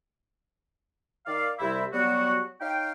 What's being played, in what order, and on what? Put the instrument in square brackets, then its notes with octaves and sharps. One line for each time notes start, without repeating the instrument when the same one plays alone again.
[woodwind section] D#3 D5 F5
C2 C3 G3 C4 E4
F#3 G3 B3 F#4
D#4 C#5 F5 G5